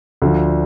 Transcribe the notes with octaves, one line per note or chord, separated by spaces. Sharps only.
D2 D3 F3